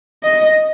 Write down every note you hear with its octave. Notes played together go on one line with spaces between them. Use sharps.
D#5